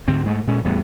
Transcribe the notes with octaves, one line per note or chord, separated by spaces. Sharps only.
D2 G#2 D3 C4
G#2 G#3 A3
A#2 G#3 C#4
E2 A2 G3 B3